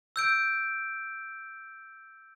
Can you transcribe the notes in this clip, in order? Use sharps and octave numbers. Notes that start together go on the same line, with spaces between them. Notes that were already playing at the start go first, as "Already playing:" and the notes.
E6 G6 D7